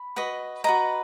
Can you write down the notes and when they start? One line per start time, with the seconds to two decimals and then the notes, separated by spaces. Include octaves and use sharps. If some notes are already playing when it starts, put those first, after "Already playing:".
Already playing: B5
0.16 F#4 B4 D#5
0.64 F#4 B4 D#5 A#5